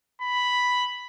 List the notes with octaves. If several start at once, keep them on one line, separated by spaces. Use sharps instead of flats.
B5